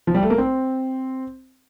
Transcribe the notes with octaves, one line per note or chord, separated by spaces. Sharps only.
F3
G3
A3
A#3
C4